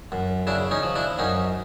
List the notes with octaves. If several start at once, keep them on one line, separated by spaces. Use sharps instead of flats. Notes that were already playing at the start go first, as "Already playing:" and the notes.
F#2
C#3 D4 E4
C#4 D#4
F3
D4 E4
F#2 C#4 D#4